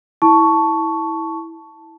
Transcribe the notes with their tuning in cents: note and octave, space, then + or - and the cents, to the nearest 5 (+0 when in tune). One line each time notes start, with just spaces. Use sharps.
E4 -10 A5 +0 C#6 +10